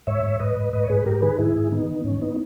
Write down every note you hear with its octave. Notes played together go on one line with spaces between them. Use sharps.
G#2 C#5 E5
G#2
G#2 B4 D#5
G#2
G#2 B4 D#5
C#5
G#2 G#4 B4
G#2 G4 A#4
D#3 G#4 B4
G#2 E4 G#4
G#2
D#3 B3 D#4
D#3
G#2 C#4
B3 D#4